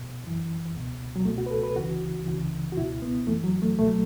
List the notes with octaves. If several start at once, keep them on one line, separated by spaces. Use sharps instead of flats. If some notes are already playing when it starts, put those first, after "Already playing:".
Already playing: B2
F#2 E3
C#2 B2
F#3
C#2 B2 A3
F#4
B4
A4
B4
C#2 C#3 E3 F#4
C#2 C#3 E3
F#4
C#2 B2 E4
B3
F#2 E3 A3
F#3
A3
C#2 B2 A3
F#3